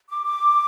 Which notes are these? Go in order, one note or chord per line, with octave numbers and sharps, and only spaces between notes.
D6
D6